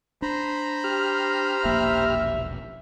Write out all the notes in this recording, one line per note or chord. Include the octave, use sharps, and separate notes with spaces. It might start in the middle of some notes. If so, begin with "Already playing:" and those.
D4 C5 A#5 B5
G4 F6
E1 A#1 A#3 E5